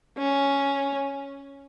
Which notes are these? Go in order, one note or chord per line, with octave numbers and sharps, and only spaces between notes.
C#4